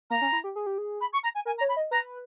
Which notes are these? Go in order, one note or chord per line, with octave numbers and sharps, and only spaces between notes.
A#3 A#5
C#4
E4
G4
G#4
G4
G#4
B5
C#6
A#5
G#5
A#4 G#5
A#5
C#5
B5
D#5
B4 A#5